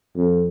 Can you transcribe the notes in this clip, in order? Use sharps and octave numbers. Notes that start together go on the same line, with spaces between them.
F2